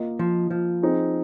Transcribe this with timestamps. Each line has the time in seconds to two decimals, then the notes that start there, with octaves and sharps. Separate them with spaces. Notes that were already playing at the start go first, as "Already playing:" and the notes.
Already playing: A#3 F4 A#4 D#5
0.19 F3
0.51 F3
0.83 C4 D#4 G#4 C5